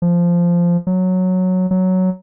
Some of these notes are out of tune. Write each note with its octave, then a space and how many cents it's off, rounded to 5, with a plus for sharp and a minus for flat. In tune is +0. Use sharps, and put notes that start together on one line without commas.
F3 -10
F#3 -5
F#3 +5